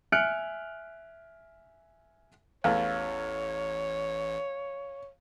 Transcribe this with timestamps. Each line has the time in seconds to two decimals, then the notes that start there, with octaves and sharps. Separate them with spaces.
0.12 E5 G#5 F6 F#6 C#7 D7
2.64 A1 E2 A3 C#5 F5